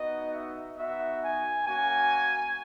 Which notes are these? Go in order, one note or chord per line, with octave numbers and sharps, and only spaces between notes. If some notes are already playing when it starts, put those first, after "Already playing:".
Already playing: B3 D#4 F#4 D#5
E5
B3 D#4 F#4 E5
G#5
A#3 C#4 F#4 G#5